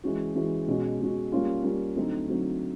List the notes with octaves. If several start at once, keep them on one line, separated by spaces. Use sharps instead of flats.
E3 G#3 C#4 F#4
E3 G#3 C#4 F#4
B2 G#3 C#4 F#4
B2 G#3 C#4 F#4
G3 A#3 C#4 F4
G3 A#3 C#4 F4
D3 F#3 A3 C4 D#4
D3 F#3 A3 C4 D#4